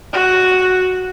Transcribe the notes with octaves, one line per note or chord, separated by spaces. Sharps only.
F#4